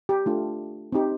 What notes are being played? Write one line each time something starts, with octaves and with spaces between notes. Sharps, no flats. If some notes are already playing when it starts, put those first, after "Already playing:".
G4
A3 D4 F4
C4 D#4 G4